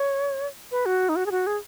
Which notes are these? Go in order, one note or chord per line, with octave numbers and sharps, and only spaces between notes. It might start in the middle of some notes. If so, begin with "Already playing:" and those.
Already playing: C#5
B4
F#4
D#4
F#4
G#4
F#4
G#4